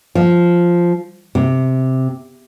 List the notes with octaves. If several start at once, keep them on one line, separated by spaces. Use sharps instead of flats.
F3
C3